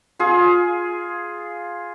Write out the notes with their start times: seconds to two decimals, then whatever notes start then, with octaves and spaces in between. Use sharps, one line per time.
0.19 F4 G#4